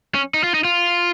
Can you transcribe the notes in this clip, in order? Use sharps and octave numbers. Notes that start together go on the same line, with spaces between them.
C#4
D#4
F4
D#4
F4